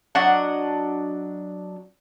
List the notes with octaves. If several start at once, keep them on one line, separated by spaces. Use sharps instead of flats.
F#3 D4 D#5 F#5